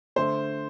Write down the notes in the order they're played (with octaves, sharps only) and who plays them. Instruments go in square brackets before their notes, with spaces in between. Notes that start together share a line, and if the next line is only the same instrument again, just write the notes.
[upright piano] D3 A3 C5